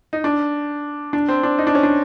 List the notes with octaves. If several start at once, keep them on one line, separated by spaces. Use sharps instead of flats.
D#4
D4
D4
C4
D4
D#4
D4
C#4
D4